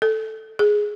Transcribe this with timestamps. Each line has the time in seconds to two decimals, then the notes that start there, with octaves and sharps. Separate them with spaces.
0.02 A4
0.59 G#4